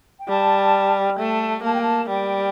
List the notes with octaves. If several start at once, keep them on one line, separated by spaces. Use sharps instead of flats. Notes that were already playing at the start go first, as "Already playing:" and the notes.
G5
G3 A5
A3 A5
A#3 A5
G5
A5
G3 G5